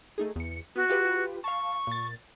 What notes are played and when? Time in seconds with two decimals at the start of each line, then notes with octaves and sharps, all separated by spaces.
0.18 A3 D#4 G#4
0.36 E2 C#7
0.76 B3 F#4
0.89 F4 G4 B4
1.44 F5 A5 C#6
1.87 A#2 A6